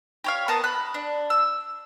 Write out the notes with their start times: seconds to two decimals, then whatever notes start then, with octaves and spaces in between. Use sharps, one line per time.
0.24 G4 C#5 F5
0.48 B3 A#4 A5 D#6
0.64 B5 F#6
0.94 D4
1.30 E6